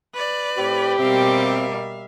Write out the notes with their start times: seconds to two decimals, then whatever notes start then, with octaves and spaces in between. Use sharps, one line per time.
0.14 B4 D5
0.57 A2 C4 G4 B5
0.99 B2 G3 A#3 C4 E5 F5